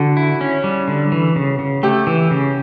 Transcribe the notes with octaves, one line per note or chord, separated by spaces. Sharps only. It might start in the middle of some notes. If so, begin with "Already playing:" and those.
Already playing: D3 F#4
E4
C#4
G3
D3
E3
C#3
C#3
A3 G4
E3
C#3